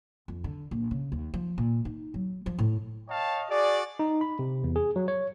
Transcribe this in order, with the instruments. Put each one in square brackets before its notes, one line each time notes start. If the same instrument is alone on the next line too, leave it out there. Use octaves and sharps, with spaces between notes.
[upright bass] F2
D3
A#1
C#3
D#2
F3
A#2
D#4
F#3
F3
A2
[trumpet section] C#5 D#5 F5 G5 A5
F#4 G#4 D5
[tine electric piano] D#4
B5
C3
E2
G#4
F#3
C#5